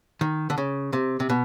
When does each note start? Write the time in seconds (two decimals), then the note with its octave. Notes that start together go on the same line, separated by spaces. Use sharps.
0.21 D#3
0.50 D3
0.58 C#3
0.93 C3
1.20 C3
1.30 B2